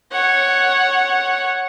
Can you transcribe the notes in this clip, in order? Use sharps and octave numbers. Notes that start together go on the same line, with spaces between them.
C#5 F#5